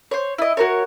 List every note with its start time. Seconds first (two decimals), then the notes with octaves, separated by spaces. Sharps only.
0.11 C5 C#5
0.38 E4 D#5
0.57 F#4 A#4 C#5